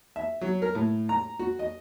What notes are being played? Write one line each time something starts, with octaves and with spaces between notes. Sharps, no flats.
E5
F#3
A#4
A2
A#5
F#4
D#5